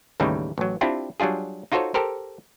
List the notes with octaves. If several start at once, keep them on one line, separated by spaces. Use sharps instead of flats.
D#2 A2 C#3 E3 G3 D#4
A1 F#3
C4 D4 E4 F4 G4
F#3 G3 D4 F4 G#4
D#4 F4 F#4 A4 C5 C#5
G4 A4 A#4 C5